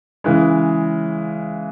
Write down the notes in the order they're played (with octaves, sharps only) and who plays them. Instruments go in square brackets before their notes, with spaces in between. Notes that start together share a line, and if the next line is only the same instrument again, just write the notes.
[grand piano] C#3 E3 G#3